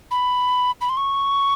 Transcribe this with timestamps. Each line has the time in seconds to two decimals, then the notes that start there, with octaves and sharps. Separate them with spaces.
0.11 B5
0.81 B5
0.89 C6
0.97 C#6